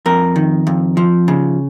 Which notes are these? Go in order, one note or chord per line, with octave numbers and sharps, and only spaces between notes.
F2 A#4
D#3
F2
F3
C#3